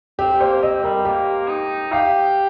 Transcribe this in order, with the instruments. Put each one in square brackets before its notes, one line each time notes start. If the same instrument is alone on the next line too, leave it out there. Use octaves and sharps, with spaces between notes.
[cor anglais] C4 [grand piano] G4
[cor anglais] A#3 [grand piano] C5
[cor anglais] C4 [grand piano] D#5
[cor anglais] G3 [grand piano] A#4
[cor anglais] A#3 [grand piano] G4
[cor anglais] D#4
[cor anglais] G4 [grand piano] F5